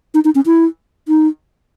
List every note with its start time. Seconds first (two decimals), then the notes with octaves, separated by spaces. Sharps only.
0.14 D#4
0.25 D#4
0.35 C#4
0.46 E4
1.08 D#4